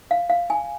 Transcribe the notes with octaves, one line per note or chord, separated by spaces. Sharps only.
F5
F5
G#5